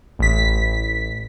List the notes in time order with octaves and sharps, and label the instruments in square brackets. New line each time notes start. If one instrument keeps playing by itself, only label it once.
[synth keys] A1 B6